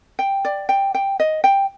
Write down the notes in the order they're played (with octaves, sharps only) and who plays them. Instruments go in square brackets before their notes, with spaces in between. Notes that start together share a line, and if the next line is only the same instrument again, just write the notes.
[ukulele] G5
D5
G5
G5
D#5
G5